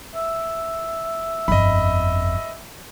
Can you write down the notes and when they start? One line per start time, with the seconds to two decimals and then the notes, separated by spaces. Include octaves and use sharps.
0.15 E5
1.48 G1 F2 D#5 B5